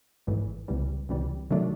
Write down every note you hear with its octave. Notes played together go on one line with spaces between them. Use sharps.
G#1 G#2 E3 A3
C#2 C3 E3 G3
C#2 C3 E3 G3
C3 D#3 F#3 A3 D4